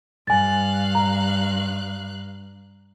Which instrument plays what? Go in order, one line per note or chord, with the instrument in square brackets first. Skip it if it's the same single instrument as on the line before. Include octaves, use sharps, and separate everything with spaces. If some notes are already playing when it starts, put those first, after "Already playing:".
[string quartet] G2 F5 F#6 [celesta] G#5 A6
[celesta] A#5